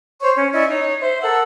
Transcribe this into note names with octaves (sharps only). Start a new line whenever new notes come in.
C5 C#5 C#6
C#4
C#4 E4 D5 D#5
D#4 C#5
C5 E5
A4 A#4 F#5 E6